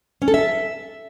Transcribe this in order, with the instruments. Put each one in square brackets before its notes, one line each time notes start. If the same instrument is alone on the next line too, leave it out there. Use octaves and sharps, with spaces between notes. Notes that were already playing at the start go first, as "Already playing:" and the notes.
[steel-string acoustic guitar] C#4
A4
E5